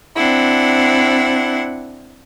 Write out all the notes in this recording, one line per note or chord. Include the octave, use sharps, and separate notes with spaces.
C4 D4 E4 F#5